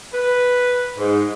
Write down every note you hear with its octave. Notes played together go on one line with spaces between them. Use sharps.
B4
G#2